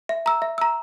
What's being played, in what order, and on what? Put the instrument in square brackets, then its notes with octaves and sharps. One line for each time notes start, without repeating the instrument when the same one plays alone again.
[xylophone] E5
A#5 E6
E5
A#5 E6